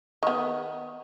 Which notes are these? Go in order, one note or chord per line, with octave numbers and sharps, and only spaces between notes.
D#3 B3